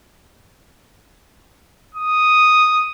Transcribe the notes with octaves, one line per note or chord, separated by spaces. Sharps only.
D#6